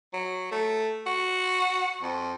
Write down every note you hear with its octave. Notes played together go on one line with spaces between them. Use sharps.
F#3
A3
F#4
F2